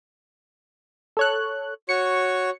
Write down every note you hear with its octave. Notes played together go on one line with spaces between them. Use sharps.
A4 C#5 F#6
F#4 C#5 C#6 C#7